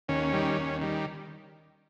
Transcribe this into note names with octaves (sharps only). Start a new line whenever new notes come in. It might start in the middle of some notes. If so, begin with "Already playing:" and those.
D#2 C#4
D#3 G3
D#2
D#3 G3